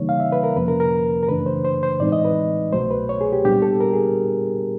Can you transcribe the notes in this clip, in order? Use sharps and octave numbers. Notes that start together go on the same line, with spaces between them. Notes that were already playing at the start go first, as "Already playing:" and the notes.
Already playing: C#3 E3 G3 A#3 D#4 C#5
F5
E5
B4
A#4
F2 C3 F3 A#3 C#4 B4
A#4
A#4
A#4
F#2 C#3 E3 A3 D4 B4
C5
C5
C5
A2 E3 G#3 C4 D#4 D5
D#5
B4
C2 B2 F#3 A3 C5
B4
C#5
G#4
G4
A#2 G3 B3 D4 G4
A4
A#4
G#4